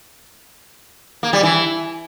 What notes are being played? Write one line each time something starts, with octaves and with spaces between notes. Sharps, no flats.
A#3
G3
E3